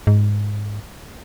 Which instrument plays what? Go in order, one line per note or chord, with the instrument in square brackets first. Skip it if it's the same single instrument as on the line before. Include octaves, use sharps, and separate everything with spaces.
[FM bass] G#2